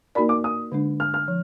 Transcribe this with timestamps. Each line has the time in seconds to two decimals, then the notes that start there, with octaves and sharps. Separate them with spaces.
0.15 A#3 D#4 F#4 A#4 D5 B5
0.29 D6
0.44 D#6
0.72 D3 G#3 D4
1.00 F6
1.14 F6
1.28 F3